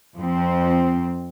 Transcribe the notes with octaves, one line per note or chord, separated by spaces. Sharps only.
F2 F3 C4